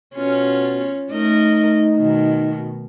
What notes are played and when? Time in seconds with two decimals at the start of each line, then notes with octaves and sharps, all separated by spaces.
0.15 B2 C#4 F4
1.11 A3 D#4 A#4 D#5
1.96 B2 D#3